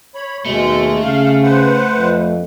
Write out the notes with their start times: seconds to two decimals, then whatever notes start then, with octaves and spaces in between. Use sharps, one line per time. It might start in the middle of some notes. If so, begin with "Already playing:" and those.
0.15 C#5 B5
0.45 D#2 B2 G#3 A3
1.02 C#3 F5
1.43 B4 C5 F#5
1.97 F2